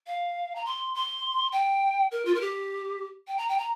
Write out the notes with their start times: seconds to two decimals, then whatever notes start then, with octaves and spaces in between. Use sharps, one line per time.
0.07 F5
0.56 A#5
0.65 C6
0.95 C6
1.52 G5
2.12 A#4
2.25 F4
2.34 A#4
2.41 G4
3.28 G5
3.38 A#5
3.49 G5
3.58 A#5